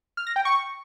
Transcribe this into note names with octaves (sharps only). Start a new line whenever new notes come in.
F6
A#6
G5
C#6